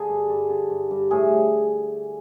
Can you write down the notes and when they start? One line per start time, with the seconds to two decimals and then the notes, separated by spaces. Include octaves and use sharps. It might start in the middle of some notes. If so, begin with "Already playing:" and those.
Already playing: D3 G#4
0.08 G2
0.29 G2
0.50 D3
0.70 G2
0.91 G2
1.11 A2 G#4